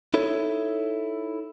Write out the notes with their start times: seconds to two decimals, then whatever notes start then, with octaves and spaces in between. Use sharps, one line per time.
0.14 D#4 E4 A4 C#5